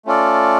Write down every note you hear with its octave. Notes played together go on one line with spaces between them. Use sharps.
A3 C#4 F4 A4 D5